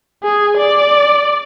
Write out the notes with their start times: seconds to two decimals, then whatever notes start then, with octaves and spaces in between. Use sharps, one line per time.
0.23 G#4
0.57 D5